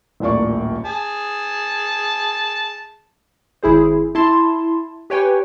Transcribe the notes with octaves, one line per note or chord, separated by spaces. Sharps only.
D#1 A#1 A2 A#3 D5 C#6
G#4 A5
G#1 E4 G#4 C5
E4 A5 C6
G4 B4 C#5 G5 G#5